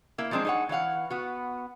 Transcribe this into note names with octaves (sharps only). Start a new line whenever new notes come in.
A#3 E4
F3 F#3 G#3 C4 D4
D#4 G#4 C5 C#5 F#5
E3 C#5 F5 F#5
B3 F#4